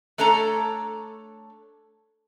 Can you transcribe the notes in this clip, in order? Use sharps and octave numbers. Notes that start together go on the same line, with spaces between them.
A3 D4 A4 C#5 A#5